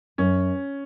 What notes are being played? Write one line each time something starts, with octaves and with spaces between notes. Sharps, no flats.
F#2 C#4